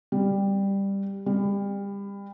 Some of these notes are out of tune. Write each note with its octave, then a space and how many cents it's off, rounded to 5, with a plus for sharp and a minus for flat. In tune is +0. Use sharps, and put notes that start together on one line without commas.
G3 +10
G3 +30